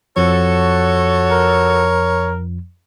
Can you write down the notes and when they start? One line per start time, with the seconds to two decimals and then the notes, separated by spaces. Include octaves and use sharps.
0.17 F2 F3 F#4 A4 C#5
1.31 A#4